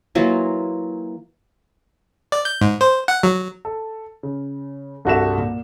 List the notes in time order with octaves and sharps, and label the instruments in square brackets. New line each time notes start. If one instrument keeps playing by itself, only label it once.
[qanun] E3 F#3 A#3 F4
[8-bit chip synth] D5
G6
G#2
C5
F#5
F#3
[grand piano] A4
C#3
C2 G2 F#4 A4 E5 E7
A#2